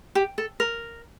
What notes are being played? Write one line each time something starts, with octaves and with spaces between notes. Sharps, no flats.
G4
A4
A#4